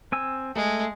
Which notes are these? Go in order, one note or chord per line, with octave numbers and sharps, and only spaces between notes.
C4 G#5 E6
G#3 A3